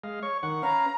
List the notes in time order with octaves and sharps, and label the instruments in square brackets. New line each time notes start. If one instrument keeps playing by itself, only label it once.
[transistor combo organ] G#3 D#5 F5
C#5 C#6
D#3 F#5 C#6
[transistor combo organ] C#4 B4 F5 [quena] A#5